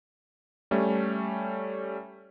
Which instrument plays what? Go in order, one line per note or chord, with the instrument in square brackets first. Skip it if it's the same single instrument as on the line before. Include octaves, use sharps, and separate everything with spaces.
[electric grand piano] G3 A3 C#4